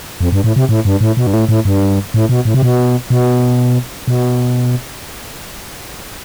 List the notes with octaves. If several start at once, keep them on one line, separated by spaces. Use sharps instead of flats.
F2
G2
A2
C3
A2
G2
A2
B2
G2
A2
A2
G2
A2
B2
A2
C3
B2
B2
B2